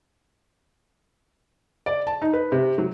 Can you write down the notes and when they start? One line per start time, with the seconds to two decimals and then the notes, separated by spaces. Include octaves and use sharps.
1.86 D5
2.07 A5
2.22 D#4
2.33 B4
2.52 C3
2.78 F#3